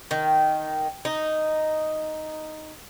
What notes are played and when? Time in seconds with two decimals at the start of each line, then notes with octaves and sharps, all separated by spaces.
0.11 D#3
1.05 D#4